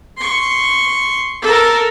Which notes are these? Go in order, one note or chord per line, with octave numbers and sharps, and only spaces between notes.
C6 C#6
A4 A#4